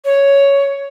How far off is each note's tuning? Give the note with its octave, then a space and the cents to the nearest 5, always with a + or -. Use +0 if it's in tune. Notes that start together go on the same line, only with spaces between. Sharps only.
C#5 +5